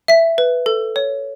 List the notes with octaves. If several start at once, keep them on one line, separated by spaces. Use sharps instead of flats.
E5 B6
B4
A4
C#5